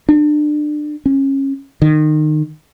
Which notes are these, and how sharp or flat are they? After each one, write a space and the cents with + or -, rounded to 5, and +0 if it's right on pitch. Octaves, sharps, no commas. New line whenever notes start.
D4 +30
C#4 -25
D#3 -25